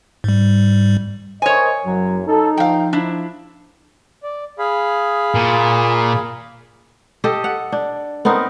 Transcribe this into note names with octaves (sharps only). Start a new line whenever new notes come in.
G#2 G3
A#4 C5 C#5 D#5 G#5
F#1 F#2 F#3
D#4 A4
F3 F5 G5
D4 E4
D5
G#4 F5 B5
A#2
G4 A4 D#5
F#5
D4
B3 C4 D#4 A#4